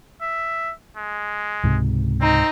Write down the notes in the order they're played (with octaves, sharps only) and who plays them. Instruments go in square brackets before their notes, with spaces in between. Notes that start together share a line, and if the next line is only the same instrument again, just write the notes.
[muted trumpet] E5
G#3
[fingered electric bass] C#2 G#2 C3
[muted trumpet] C4 [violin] D#4